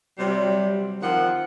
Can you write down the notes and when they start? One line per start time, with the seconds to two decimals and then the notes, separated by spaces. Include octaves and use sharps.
0.18 C3 F#3 G3
1.02 D#3 F3 C4 F#5